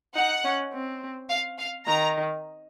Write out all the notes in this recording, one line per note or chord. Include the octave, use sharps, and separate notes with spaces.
D#4 F#5
C#4
C4
F5
F5
D#3 A#5